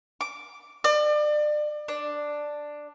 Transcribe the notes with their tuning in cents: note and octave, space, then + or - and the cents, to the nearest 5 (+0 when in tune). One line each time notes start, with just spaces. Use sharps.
D6 -5
D5 +30
D4 +5